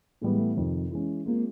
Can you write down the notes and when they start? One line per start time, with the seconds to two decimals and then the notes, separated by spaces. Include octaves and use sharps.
0.21 A2 E3 G3 G#3 B3
0.39 A3
0.57 F2 C3 D#3
0.91 E3 G#3 C#4
1.26 G#3 A#3 C4 F4